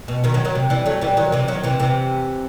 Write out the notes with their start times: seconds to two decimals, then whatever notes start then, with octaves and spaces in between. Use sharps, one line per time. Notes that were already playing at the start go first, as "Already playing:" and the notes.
0.08 B2
0.24 B2 D#3
0.34 D#3 F#3
0.45 D#3 F#3
0.55 C3
0.70 E3 G3
0.86 F#3 A3
1.01 E3 G3
1.17 D#3 F#3
1.32 C3 E3
1.48 D#3 F#3
1.63 C3 E3
1.80 C3 E3